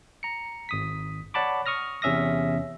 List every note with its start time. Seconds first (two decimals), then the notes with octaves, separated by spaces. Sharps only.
0.23 A#5 C#7
0.69 G#1 D#6 B6
1.34 C#5 D5 F#5 A5 B5 D6
1.66 C#6 D#6 F6 A#6
2.02 E2 C3 C#4 E5 D#6 A#6